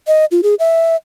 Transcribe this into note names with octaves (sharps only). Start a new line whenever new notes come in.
D#5
F4
G#4
E5